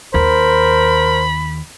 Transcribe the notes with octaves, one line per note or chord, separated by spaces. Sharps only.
D#2 A#4 C5 B5